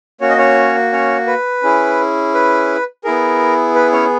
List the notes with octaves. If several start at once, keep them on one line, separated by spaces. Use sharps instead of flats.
A#3 C#4 F#4 C#5
D#5
C#4 C#5
C#4 C#5
B4
C#4 E4 G#4
B4
B3 E4 G#4 A#4
B4
C#4 C#5